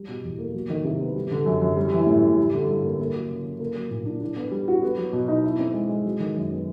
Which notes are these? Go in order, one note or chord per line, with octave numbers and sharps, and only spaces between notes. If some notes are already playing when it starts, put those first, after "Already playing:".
Already playing: G3
B2
E2
A#3
F#3
D#3
C3
B3
G3
D3
F#2
F#2
G3
E3
A2
A2
G3
D3
G2
A#3
A#3
F#3
C#3
C#3
A#3
F#3
A#2
D4
D4
B3
G3
F#4
B3
F#3
B2
D#4
E4
C4
G#3
G#3
F#3
D#3
F#2
B3